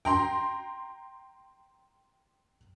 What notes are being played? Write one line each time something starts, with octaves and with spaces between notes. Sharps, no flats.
G5 A#5 C6